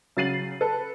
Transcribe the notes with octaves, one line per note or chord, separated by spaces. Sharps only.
C#3 F#3 A6 C7 D#7 F#7
A4 B4